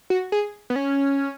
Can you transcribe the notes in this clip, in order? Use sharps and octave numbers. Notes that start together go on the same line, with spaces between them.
F#4
G#4
B3
C#4